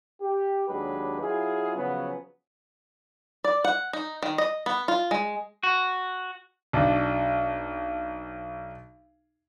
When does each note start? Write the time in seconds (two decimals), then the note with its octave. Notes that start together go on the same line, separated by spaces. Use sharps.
0.22 G4
0.68 D#2 F#3 G#3 D4 G4 B4
1.21 F#3 E4 F4 G#4
1.76 C#3 F3 F#3 B3 C#4
3.44 D5
3.64 F#5
3.93 D#4
4.23 D#3
4.38 D#5
4.66 B3
4.88 F4
5.11 G#3
5.63 F#4
6.73 B1 D4